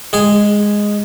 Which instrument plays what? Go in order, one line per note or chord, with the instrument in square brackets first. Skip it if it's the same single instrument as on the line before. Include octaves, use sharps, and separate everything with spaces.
[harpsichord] G#3 G#4